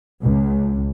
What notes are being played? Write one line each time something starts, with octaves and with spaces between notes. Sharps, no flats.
C#2